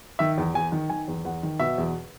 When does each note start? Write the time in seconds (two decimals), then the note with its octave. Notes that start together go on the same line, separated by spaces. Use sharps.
0.19 D#3 E5
0.38 E2
0.54 E2 G#5
0.72 D#3
0.90 D#3 G#5
1.08 E2
1.25 E2 F#5
1.43 D#3
1.60 B2 E5
1.78 E2